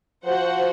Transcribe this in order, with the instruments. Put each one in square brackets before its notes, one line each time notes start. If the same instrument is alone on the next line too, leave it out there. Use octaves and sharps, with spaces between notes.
[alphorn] F3 [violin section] F#4 C5 F#5